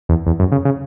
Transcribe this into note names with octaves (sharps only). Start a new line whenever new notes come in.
E2
E2
F#2
C#3
C#3